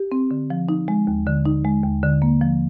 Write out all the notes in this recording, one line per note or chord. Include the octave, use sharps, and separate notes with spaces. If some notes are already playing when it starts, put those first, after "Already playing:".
Already playing: G4
C4
D3
F3
D#4
G#3
D#2
D3
D#4
G#3
D#2
D3
A#3
F3